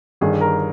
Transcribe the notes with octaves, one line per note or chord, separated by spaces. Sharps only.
G1 G2 D#3 G#4
A#4